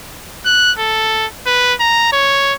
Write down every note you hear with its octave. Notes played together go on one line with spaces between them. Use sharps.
F#6
A4
B4
A#5
C#5